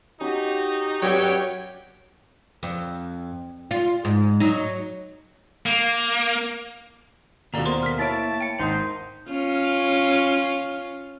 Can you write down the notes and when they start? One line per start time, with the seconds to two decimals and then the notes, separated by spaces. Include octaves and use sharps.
0.21 C#4 D#4 F#4 G4
1.02 F#3 F#4 G4 B4 C#5 D5 G5
2.63 F2
3.71 F4
4.05 G#2
4.40 F#3 D#4
5.66 A#3
7.54 D#2 B2 A#3 E4 F4 A4 D5 A#5
7.66 A#3 A#4 C5 C6
7.83 F6 B6
7.99 E4 C#5 A5 A6 D7
8.41 G5 C#7
8.59 G#1 D#4 C5 D#6
9.30 C#4 F4